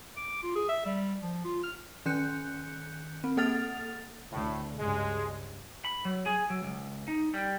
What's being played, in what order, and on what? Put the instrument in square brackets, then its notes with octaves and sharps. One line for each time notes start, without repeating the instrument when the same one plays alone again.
[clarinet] D6
F4
G#4
E5
G3
F3
F4
F6
[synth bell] D#3 C#4 F#6 G6 C#7
C4
A#3 A4 F#5 F6 A6 F7
[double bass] D2 [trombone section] A2
[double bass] C#2 G2 [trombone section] G#3
[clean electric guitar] B5
F#3
G#4
F#3
C#2
D#4
G3